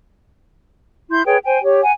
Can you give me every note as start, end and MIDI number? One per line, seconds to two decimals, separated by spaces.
1.11 1.22 64
1.11 1.22 84
1.11 1.22 91
1.26 1.38 68
1.26 1.38 71
1.26 1.38 73
1.26 1.38 79
1.45 1.60 72
1.45 1.60 79
1.45 1.60 80
1.62 1.80 67
1.62 1.80 73
1.81 1.91 78
1.81 1.91 80